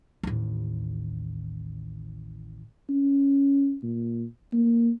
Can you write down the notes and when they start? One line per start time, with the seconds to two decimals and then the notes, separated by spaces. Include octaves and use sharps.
0.23 A1 D#2
2.89 C#4
3.83 A#2
4.53 A#3